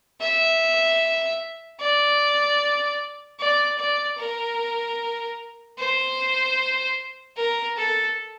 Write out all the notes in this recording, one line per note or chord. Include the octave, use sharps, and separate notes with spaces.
E5
D5
D5
D5
A#4
C5
A#4
A4